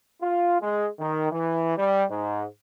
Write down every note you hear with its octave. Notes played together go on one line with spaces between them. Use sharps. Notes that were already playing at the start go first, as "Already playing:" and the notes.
F4
G#3
D#3
E3
G3
G#2